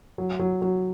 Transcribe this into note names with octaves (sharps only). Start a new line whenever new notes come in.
F#3
F#3
F#3